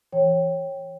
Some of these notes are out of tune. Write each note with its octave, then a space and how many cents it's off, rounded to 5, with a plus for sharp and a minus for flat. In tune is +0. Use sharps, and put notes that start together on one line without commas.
E3 +20 C#5 -15 G5 -5